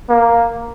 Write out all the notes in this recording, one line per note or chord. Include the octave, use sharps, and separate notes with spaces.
A#3